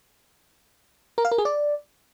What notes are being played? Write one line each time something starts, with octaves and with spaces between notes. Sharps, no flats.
A#4
F5
A#4
G#4
D5